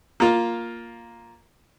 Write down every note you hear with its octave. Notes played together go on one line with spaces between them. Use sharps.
A#3 F4